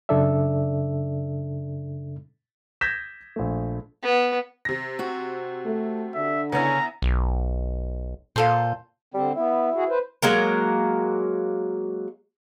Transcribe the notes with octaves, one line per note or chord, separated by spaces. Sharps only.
F#2 C#3 D4 A4 D5 E5
G6 G#6 A#6 B6 E7
A#1 A3
B3
C3 A#6
C4 F#4
A3
D3 E5
C#3 B3 C#4 E4 A#5
B1
A#2 F4 A4 C5
D3 G3 C4
B3 E4
F#4 G#4
B4 C5
F#3 G#3 A#3 A#4